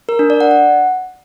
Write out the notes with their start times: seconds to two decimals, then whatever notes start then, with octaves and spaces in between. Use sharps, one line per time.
0.09 A#4
0.19 D4
0.30 D5
0.40 F#5
0.51 F#5